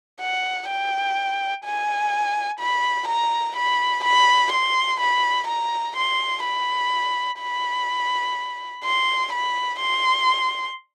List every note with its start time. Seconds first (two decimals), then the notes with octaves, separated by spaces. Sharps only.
0.20 F#5
0.68 G5
1.65 G#5
2.60 B5
3.08 A#5
3.56 B5
4.04 B5
4.53 C6
5.00 B5
5.47 A#5
5.96 C6
6.44 B5
7.40 B5
8.84 C6
9.32 B5
9.79 C6